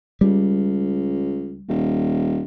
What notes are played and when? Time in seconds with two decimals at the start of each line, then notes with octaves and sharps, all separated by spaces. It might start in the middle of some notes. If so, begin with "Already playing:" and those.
0.21 C#2 G3
1.68 D#1